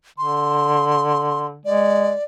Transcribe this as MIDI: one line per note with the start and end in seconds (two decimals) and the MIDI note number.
0.18 1.59 50
0.18 1.46 84
1.65 2.11 56
1.65 2.24 74